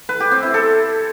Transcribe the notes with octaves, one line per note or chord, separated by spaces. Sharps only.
B4
G4
C4
E4
A4